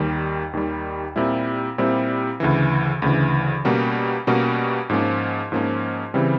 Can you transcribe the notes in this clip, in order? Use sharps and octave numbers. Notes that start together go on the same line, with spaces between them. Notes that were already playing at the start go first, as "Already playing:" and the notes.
Already playing: D#2 D#3 G3
D#2 D#3 G3
A#2 G3 C4 E4
A#2 G3 C4 E4
D2 C#3 E3
D2 C#3 E3
B2 G3 A#3 C#4 F#4
B2 G3 A#3 C#4 F#4
G#2 F3 A#3 C#4
G#2 F3 A#3 C#4
C#3 E3 G3 C4